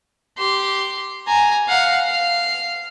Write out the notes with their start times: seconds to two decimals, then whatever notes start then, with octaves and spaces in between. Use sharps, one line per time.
0.38 G4 C6
1.27 G#5 A#5
1.68 F5 F#5
2.07 F5